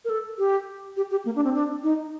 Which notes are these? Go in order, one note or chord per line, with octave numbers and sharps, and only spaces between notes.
A#4
A4
G4
G4
G4
A#3
D4
C4
D4
D#4